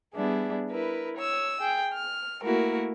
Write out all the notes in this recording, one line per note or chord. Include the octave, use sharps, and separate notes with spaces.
G3 B3 D4 E4 G#4
E4 A#4 B4
C#5 E6
G#4 G5
F6
A3 A#3 E4 F#4 A#4